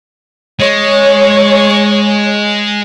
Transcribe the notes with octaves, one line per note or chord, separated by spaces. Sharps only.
G#3 C#5